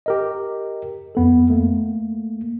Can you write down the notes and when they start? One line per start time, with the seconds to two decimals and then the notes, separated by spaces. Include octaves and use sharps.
0.06 G4 A#4 D#5
1.15 F2 B3 A4
1.50 A3 A#3